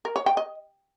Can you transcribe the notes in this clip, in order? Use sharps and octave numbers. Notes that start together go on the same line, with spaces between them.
A#4
C#5
G5
D#5